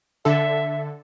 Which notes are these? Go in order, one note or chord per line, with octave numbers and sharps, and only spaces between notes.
D3 A4 E5